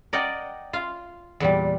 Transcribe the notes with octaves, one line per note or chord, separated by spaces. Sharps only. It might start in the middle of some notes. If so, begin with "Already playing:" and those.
A#4 D5 D#5 F#5 G5
F4 F5
E2 A#2 G3